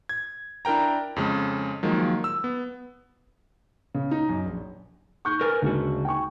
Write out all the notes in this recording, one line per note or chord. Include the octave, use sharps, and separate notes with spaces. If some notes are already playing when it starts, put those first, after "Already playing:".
G#6
D4 E4 A#4 G5 A#5
F2 C#3 G#3
D#3 F3 F#3 G#3 A#3
E6
B3
C#3
D#4
F#2
A#1
C#6 G6
A#4 B4 G#5
D2 C#3 G#3 F#4
G5 G#5 C#6